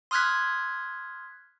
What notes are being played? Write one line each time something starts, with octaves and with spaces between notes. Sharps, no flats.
C6 D#6 F6 F#6 G#6 B6